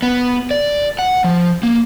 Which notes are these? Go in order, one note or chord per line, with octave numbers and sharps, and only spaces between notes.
B3
D5
F#5
F3
A#3